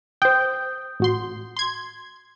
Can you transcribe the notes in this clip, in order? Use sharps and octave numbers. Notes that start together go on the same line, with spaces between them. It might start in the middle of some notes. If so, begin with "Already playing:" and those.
C5 G5 D#6 G6
A1 F#4 C6
C6 G#6